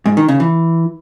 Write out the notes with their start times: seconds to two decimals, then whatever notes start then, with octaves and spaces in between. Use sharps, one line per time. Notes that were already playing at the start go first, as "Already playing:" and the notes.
0.06 G#2
0.17 D#3
0.28 C#3
0.40 E3